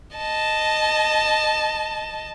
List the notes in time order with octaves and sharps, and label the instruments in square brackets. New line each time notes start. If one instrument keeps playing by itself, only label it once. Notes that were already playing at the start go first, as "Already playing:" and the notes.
[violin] D#5 A5